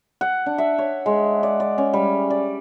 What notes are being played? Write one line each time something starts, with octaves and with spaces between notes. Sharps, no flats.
F#5
D4
E5
C#5
G#3
D5
D5
C#4
G3
D5